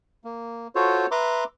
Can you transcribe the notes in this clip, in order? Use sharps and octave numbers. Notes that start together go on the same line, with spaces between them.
A#3
F4 F#4 A4 C5 C#5
B4 E5 A#5 C6 D6